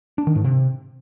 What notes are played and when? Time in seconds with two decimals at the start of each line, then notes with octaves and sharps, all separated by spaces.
0.18 D4
0.27 D#3
0.36 G#2
0.44 C3